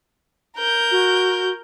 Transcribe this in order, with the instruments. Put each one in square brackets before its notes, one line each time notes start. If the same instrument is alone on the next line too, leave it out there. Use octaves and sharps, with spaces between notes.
[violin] A#4 G6
[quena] F#4